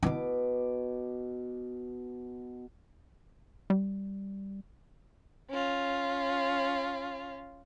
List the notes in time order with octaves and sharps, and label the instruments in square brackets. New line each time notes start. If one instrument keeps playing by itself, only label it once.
[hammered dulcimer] B2 D6 [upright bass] D#4 E4
[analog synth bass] G3
[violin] C#4 F4